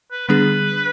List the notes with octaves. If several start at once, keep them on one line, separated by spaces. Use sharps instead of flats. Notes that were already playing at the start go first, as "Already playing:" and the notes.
B4
D3 G3 B3 D4 G#4 B4